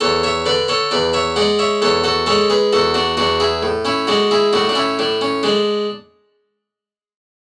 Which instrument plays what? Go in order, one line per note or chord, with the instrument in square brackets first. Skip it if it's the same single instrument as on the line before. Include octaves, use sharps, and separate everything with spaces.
[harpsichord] E2 A4 C#5
C#5 E5
D3 B4 D5
A4 C#5
E2 B4 D5
C#5 E5
G#3 D5 F#5
C#5 E5
E2 A4 C#5
F#4 A4
G#3 A4 C#5
G#4 B4
E2 F#4 A4
D4 F#4
E2 D4 F#4
E4 G#4
A2
C#4 E4
G#3 D4 F#4
E4 G#4
A2 D4 F#4
D4
C#4 E4
A2 D4
C#4
G#3 D4